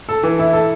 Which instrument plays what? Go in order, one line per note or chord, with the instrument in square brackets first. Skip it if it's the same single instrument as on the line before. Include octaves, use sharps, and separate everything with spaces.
[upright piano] A4
E3
E4
A4